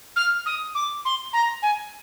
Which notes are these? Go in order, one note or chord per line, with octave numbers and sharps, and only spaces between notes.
F6
D#6
D6
C6
A#5
G#5